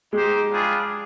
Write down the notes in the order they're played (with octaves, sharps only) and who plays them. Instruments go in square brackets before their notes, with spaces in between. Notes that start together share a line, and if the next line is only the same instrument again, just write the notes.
[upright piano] G#3 [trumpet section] D#4 G4 C5
[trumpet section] G3 D4 F4 G#4